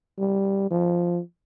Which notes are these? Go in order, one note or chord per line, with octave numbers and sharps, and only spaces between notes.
G3
F3